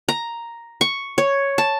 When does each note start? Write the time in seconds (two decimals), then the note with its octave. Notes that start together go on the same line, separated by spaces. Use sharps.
0.09 A#5
0.81 C#6
1.18 C#5
1.58 A5